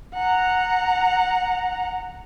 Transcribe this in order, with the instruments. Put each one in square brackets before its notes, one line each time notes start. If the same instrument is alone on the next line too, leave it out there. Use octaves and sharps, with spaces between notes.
[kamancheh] F#5 A#5